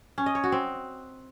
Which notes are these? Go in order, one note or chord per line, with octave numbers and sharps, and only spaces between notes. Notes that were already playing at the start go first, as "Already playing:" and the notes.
C#4
D#5
C#5
F#4
C4